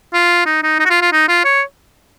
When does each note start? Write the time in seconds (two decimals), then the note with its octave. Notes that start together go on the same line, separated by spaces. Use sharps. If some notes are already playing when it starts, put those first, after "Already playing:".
0.14 F4
0.46 D#4
0.63 D#4
0.80 D#4
0.85 F#4
0.90 F4
1.01 F4
1.12 D#4
1.28 F4
1.45 C#5